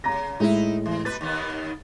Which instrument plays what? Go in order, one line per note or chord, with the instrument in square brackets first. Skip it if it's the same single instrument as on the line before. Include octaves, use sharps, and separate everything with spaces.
[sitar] C#3 [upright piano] A#5 A#6
[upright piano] A2 G#3 [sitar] D#4 E4
[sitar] E3
[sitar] B2 B4 [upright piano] A6
[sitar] D#2 D#3 B3